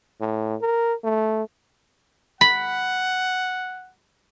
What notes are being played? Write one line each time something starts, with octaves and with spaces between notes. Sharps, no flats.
A2
A#4
A3
F#5 B5